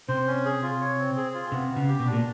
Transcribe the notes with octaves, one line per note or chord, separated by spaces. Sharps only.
C3 C5
C#4
G#4
F4
C#5
C4
G#4
F4
C3 B3
B3
C#3
G4
B2
D4
A#2